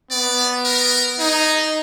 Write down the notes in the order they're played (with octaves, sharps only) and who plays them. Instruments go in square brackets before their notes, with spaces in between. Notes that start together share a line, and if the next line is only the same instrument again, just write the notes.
[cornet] B3 [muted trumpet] D5
[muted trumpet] A#4
[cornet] D#4 [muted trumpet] G#4